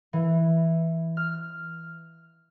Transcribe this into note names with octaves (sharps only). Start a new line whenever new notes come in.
E3
F6